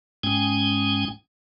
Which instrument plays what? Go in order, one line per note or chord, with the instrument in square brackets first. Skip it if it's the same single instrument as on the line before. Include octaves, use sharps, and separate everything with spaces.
[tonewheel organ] G#2 G#3 C#4 G5 G#5